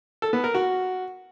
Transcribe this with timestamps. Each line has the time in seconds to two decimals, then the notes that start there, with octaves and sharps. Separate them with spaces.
0.22 A4
0.33 B3
0.44 A#4
0.54 F#4